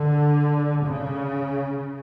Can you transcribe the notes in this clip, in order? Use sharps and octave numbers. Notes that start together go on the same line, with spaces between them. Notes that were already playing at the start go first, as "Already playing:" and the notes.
Already playing: D3
C#3